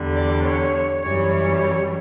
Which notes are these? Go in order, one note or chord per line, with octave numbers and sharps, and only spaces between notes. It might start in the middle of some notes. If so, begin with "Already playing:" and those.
Already playing: E2 D3 G3
D5
C#5
F#2 E3 G3 C#5
C#5